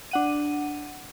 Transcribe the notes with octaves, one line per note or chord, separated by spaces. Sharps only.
D4 F#5 D#7